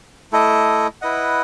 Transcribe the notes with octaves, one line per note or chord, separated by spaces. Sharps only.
A3 E4 A4 D#5
E4 B4 D#5 F#5